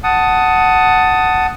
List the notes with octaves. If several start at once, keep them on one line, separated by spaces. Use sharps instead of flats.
F#5 A5 D#6